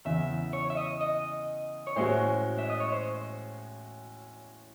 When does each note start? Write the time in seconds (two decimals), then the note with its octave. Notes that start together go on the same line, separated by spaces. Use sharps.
0.05 E2 C#3 E3 E5
0.53 C#5
0.70 E5
0.77 D#5
1.01 D#5
1.87 C#5
1.96 A2 G#3 C#4 F#4 C5
2.58 E5
2.70 D#5
2.80 C#5
2.92 C5